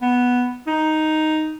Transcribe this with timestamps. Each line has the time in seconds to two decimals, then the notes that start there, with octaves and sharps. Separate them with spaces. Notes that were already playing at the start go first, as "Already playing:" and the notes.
0.02 B3
0.67 D#4